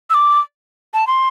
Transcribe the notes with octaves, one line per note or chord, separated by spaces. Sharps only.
E6
D6
A5
C6